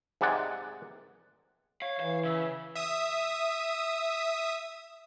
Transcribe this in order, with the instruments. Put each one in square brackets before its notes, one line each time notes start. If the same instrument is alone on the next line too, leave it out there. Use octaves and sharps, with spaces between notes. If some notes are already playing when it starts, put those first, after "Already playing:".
[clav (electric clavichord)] G#2 C3 G#3 D5 F#5
[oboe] C#5 [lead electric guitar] F5
[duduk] E3 [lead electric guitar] F5
[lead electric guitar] C#3 [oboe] E5
[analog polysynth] E5 D#6